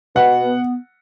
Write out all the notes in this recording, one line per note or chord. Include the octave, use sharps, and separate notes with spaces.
B2 F#5
B3